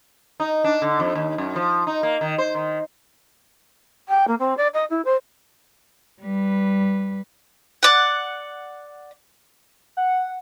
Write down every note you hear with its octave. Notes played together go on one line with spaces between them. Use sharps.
D#4
D4
D3
F2
D#2
F#2
F3
D#4
A#3
D#3
C5
D#3
G5
A#3
C4
D5
D#5
E4
C5
G3 B4
D5 F#5
F#5